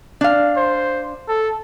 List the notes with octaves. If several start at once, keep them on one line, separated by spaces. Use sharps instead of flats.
D4 F5
C5
A4